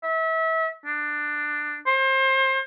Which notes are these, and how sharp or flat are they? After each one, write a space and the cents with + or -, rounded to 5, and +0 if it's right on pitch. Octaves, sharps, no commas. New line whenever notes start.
E5 -30
D4 +15
C5 +30